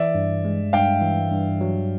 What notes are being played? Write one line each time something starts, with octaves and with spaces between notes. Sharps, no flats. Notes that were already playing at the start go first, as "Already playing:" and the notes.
Already playing: E3 D5 E5
G2
G#3
G2 F5 G5
E3
G2
F#3